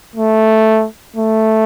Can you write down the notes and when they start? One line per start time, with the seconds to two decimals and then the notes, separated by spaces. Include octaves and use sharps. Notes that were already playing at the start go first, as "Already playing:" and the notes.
0.16 A3
1.16 A3